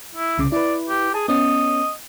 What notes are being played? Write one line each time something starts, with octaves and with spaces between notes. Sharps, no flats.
E4
C2 C#3 D6
E4 B4 D5
G4
G#4 G#5 A5
B3 C#4 D#5